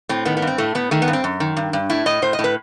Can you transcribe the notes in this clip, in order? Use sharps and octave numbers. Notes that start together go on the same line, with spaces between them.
A2 C4
D#3 B3
B3
G2
C4
A2 A3
A2 B3
D#3 A3
B3
G2
C4
F#2
D#3
G2
G2
A2 E4
A2 D#5
A2 C5
D#5
A2
B4